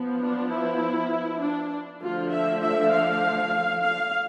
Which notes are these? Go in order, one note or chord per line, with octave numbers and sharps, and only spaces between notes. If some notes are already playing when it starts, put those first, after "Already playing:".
Already playing: F3 B3
D4
E4
D4
D3 F3 A3 D4 F4
E5
E5
F5
F5